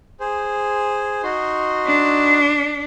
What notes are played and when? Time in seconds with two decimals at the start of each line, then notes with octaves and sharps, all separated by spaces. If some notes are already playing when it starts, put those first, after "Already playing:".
0.20 G#4 C5
1.23 D#4 F#4 C6
1.86 D4